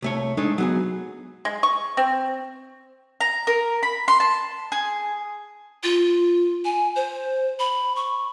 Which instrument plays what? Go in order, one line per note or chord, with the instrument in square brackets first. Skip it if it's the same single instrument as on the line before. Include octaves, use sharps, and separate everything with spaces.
[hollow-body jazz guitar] C2 A3 C#5
G#3 A3 D4 D#4
F#3 B3 G#4
[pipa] G#3
C#6
C4
[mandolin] A#5
A#4
B5
C6
A5
G#4
[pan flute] F4
G#5
C5
B5
C#6